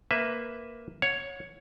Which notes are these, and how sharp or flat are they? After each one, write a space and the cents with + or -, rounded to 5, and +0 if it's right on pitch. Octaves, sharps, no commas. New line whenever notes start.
A#3 +0 B4 +10 E5 +0
C#5 +0 F#5 -40